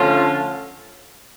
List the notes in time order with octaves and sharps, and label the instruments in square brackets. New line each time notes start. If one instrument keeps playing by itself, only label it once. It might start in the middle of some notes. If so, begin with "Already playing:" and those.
Already playing: [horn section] D3 F3 A3 C#4 F4